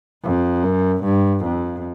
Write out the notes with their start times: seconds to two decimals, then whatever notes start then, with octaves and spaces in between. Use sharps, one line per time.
0.24 F2
0.63 F#2
1.04 G2
1.45 F2